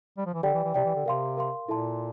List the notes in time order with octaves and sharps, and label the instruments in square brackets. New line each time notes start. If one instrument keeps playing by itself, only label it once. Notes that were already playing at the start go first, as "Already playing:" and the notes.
[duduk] G3
F3
E3
[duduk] D3 [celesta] G4 D5 G5
[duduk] E3
E3
[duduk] C3 [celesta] G4 D5 G5
[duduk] E3
D3
[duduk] C3 [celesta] A#4 F5 C6
[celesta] A#4 F5 C6
[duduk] A#2 [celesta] E4 A4 E5 A5 C6